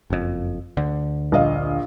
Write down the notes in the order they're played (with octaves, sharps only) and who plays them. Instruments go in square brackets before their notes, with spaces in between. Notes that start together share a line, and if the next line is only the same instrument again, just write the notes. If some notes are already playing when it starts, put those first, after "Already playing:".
[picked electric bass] F#1 F2
D2 D3
[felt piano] A#1 D#5 F5